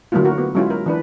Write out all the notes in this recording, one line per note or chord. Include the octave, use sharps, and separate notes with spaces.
D3 F#3 A3 A#3 E4 F4
D3 F#4 A#4
B3
F#3 G#3 C#4 E4 F4
A#4
E3 D4 B4